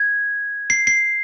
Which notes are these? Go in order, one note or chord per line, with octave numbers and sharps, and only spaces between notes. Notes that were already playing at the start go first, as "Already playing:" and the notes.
Already playing: G#6
C7
C7